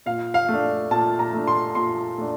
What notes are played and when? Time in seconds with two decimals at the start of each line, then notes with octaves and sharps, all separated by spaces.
0.06 A#2 F5
0.34 F5
0.49 A3
0.54 D4
0.91 A#2 A5
1.19 A#5
1.33 A3 D4
1.48 C6
1.75 A#2 C6
2.18 A3 D4